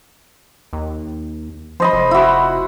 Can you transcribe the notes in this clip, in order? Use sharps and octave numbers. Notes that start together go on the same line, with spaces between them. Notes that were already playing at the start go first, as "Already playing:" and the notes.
D#2
F3 C5 D#5 B5
F1
E4 F#4